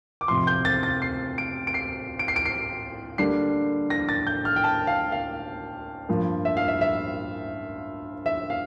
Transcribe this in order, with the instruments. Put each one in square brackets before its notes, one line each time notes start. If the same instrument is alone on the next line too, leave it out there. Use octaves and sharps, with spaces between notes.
[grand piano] D6
F2 C3 F3 C6
G6
A6
A6
C7
D7
D7
C7
D7
C7
D7
C7
D3 G3 A#3 D4 C7
A#6
A6
G6
F6
G5
A5
F5
F5
G2 F3 A#3
E5
F5
E5
E5
E5
F5